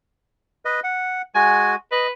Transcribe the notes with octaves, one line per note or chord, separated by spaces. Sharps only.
B4 D#5
F#5
G#3 F#4 G#5
B4 D#5